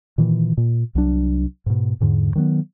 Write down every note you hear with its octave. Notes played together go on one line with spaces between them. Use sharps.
A#2 D#3 E3
A#2
C2 F#3 D4
G#2 B2
E2 G#2 D3
D#3 F#3 G#3 B3